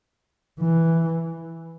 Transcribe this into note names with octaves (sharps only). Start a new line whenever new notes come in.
E3